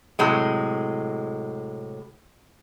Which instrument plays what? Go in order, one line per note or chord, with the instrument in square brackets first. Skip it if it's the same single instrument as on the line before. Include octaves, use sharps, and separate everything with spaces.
[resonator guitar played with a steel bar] A2 C3 F#3 G#3